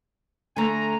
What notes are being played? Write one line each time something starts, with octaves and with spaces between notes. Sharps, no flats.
D3 A3 G#5 A#5